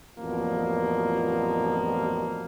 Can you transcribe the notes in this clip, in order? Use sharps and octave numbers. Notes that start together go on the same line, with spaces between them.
A1 F2 B2 F3 G3 A#3